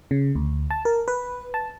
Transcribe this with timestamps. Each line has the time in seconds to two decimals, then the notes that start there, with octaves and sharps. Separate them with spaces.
0.11 C#3
0.35 D2
0.70 A5
0.85 A#4
1.08 B4
1.54 A5